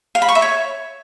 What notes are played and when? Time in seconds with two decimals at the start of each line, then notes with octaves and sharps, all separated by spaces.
0.15 F5
0.22 B5
0.29 C#6
0.35 E5
0.42 C#5